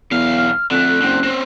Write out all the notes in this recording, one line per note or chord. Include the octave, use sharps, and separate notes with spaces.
B1 E2 F5
F6
F2 D3 A3 F#6
F#1 D3 C4
C4 C#4